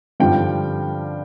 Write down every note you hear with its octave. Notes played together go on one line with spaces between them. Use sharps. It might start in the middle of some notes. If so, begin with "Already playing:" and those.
G2 D3 F3 G5